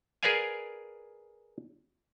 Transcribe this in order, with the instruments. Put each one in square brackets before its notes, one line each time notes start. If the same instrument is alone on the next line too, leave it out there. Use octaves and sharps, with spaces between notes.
[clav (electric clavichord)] G#4 A#4 B4 D5 F5 G#5